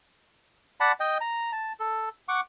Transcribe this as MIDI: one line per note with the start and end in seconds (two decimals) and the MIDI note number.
0.80 0.92 74
0.80 0.92 78
0.80 0.92 81
0.80 0.92 83
1.00 1.18 75
1.00 1.18 79
1.21 1.52 82
1.52 1.73 81
1.80 2.09 69
2.28 2.41 78
2.28 2.41 85
2.28 2.41 86